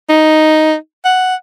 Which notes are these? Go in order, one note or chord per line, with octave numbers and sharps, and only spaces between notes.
D#4
F#5